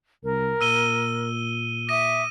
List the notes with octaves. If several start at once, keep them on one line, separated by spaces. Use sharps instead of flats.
C2 A#4
A#2 E6 D#7 G7
E5 D6 D#6 A#6 D#7